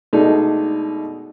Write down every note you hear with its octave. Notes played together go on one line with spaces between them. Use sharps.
B2 G#3 A3 D4 D#4